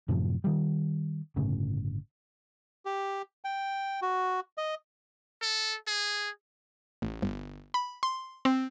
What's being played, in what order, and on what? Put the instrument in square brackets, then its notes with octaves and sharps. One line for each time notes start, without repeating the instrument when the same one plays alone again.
[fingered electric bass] F#2 A2 C3 F3
D#3 G3
G1 A2 C#3
[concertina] G4
G5
F#4
D#5
[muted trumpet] A4
G#4
[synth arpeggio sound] A1
G1
B5
C6
C4